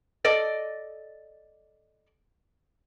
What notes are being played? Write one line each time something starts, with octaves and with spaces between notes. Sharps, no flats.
A4 D5 D#5